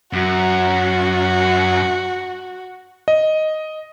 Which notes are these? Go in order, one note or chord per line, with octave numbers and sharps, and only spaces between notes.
F#2 F#4
D#5